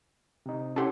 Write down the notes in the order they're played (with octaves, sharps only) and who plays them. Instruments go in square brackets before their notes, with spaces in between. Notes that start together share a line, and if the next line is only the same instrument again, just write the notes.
[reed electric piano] C3 D#4
[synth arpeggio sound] C#4 E4 G4 [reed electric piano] A4 F#5 C6